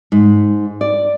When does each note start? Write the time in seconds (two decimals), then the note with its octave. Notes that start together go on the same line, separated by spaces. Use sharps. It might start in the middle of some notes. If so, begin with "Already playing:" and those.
0.12 G#2
0.81 D5